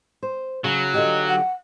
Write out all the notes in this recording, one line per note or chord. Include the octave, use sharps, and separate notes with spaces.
C5
C#3 F#3
D3 F4 G4 D#5
F#5